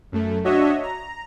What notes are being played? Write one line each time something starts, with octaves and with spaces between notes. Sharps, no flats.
F#2 A3
D4 F#4 C#5 D#5 E5
A#5